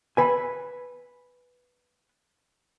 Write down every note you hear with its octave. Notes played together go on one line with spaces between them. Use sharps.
B4 G#5